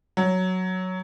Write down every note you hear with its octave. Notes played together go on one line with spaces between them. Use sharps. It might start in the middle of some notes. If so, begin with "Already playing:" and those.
F#3